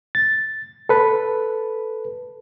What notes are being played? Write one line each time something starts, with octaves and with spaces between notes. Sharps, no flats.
A6
A4 B4